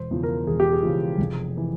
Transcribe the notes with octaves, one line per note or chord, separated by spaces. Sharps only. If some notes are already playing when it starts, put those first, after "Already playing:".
Already playing: E1 C5
E2 C#3 F3
A#4
E1 G#4
G4
G#4
E2 C#3 F3
F1
E3